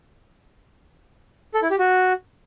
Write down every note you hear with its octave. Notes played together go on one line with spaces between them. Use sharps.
A4
E4
G4
F#4